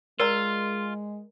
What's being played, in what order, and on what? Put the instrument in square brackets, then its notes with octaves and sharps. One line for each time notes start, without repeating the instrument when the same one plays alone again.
[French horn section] G#3 [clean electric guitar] F4 [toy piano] A#4 D5 A#5